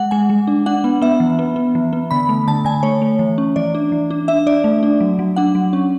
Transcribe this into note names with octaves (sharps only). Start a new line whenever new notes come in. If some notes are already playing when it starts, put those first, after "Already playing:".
Already playing: G#3 F#5
G#3 G#5
G#3
D4
D4 F#5
B3
B3 E5
E3
B3
B3
E3
B3
D3 B5
A3
D3 A5
D3 G#5
A3 C#5
A3
E3
C#4
E3 D5
D4
E3
D4
D4 E5
D4 D5
A3
D4
F#3
F#3
D4 F#5
F#3
C#4